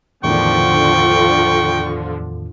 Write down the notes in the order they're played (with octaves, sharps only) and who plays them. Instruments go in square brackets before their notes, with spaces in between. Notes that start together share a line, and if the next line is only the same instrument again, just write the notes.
[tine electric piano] E2 A2 D#3 [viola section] D3 F3 [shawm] G5 [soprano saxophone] C#6